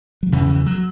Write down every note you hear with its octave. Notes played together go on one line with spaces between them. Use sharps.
F#3
E2 C#3 E3
E3
F#3